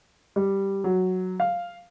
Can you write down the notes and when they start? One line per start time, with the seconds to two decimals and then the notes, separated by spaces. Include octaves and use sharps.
0.36 G3
0.84 F#3
1.40 F5